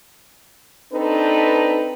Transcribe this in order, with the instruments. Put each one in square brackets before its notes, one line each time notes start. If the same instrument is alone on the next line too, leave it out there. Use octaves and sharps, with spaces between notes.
[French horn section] C4 D4 D#4 A4 B4